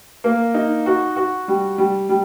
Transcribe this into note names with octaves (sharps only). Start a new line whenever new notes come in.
A#3
D#4
F#4
F#4
G3
G3
G3